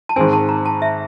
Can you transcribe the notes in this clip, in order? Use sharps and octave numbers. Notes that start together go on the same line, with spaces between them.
A5
G#2 D#3 G#3 C4 G#5
A5
A#5
A5
E5